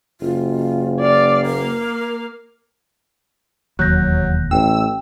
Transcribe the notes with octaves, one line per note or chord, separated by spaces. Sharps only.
F#1 F4
D5 F5
A#3 A#4 F5
E1 D#2 F#3 F#6 G6 A#6
A1 G5 E6